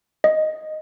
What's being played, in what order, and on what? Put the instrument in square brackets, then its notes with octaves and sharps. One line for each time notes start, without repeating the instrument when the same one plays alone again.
[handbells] D#5